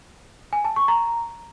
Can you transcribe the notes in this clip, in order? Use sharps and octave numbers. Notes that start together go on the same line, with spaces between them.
G#5
A5
C#6
A#5